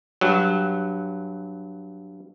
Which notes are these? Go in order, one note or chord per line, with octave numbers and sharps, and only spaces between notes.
G2 F#3